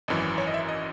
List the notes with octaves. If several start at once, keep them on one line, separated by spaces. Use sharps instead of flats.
G#1 F#2 E3 D#5
C#5
D#5
E5
D#5